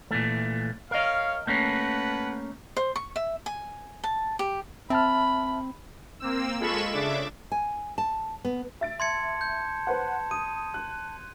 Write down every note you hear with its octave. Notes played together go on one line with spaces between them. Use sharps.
A#2 E3 A3
A#4 C#5 D#5 F5
A3 A#3 C#4 B4 F#5 A5
C5
C#6
E5
G#5
A5
G4
C4 E5 A5 B5 F6
A#3 C4 E6
G#3 F4 A4 B5 C#6 E7
C#3 D4 E5 D6
G#5
A5
B3
E5 A6 D7
A5 C6 G#6 C#7
G6
B4 C5 F#5
D#6 D#7
F#6